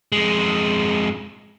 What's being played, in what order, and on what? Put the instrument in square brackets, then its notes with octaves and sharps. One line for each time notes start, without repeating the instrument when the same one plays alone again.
[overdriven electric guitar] F2 G#3